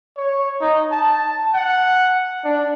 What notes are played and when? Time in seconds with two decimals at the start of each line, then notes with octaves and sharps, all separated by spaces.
0.17 C#5
0.61 D#4
0.91 A5
1.54 F#5
2.45 D4